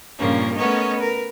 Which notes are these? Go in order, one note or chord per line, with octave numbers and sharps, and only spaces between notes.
G2 A#2 C#3 F3 A#3 C#4
A3 B3 C#4 A#4 C#5 D#5
A#4 B4